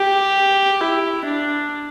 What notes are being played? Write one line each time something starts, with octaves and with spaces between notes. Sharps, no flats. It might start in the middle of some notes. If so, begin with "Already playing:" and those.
Already playing: G4
E4
D4